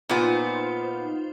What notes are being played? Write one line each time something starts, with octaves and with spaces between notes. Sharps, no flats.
A#2 B3 D#4 F4 C5